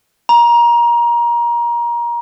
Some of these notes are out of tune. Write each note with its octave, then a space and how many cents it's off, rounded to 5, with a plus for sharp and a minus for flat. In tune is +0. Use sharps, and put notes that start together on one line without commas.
A#5 +25